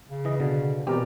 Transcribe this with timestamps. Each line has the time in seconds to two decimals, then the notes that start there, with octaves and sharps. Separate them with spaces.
0.10 C#3
0.25 E3 D#5
0.40 B2 D3
0.87 B2 E3 C4 G4 A#4 D5